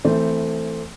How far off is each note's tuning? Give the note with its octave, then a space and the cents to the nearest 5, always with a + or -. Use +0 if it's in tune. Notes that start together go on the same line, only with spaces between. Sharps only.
E3 +0 A3 +15 C4 +0